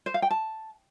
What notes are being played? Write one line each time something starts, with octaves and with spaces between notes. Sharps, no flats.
C5
F5
G5
A5